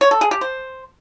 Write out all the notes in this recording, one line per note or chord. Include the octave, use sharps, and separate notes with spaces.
C#5
A4
G#4
G4
C5